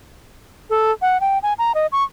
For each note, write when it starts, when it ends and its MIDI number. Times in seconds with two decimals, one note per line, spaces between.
0.70 0.91 69
1.02 1.20 78
1.21 1.38 79
1.43 1.53 80
1.58 1.72 82
1.75 1.87 75
1.92 2.04 85